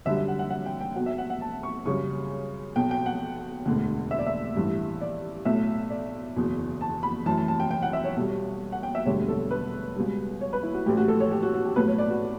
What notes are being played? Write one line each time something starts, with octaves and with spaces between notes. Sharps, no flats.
F#2 D3 G3 E5
E5
F#5
F#5
F#5
G5
G5
B1 B2 F#3 F#5
E5
F#5
F#5
A5
C#6
F#2 C#3 G3 C#6
B1 B2 F#3 G5
G5
F#5
E1 D2 D3
E5
D5
E5
A1 G2 E3
D5
B1 A2 F#3 A3 E5
D5
F#1 E2 B2
A5
B5
F#2 E3 A3 A5
A5
A5
G5
G5
F#5
E5
C#5
B1 B2 G3
F#5
G5
E5
E1 D2 D3 G3 C#5
A4
B4
C#2 B2 G3
C#5
B4
E4
F#4
A1 A2 F#3 A3 G4
F#4
A4
C#5
G4
F#4
F#4
G4
B1 A2 F#3 B4
C#5
D5
F#4